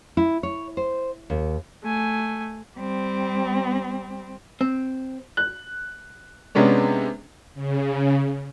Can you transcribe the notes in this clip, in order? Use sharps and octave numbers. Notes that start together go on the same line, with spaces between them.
E4
C#5
C5
D#2
A3 G#5
G3 C4
C4
F#6
C3 G#3 B3 C#4 D4
C#3